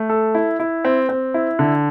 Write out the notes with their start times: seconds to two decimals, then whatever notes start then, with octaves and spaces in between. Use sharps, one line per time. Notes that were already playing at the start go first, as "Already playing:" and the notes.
Already playing: A3
0.09 A4
0.35 E4
0.60 E4
0.85 C4
1.09 C4
1.34 E4
1.59 D3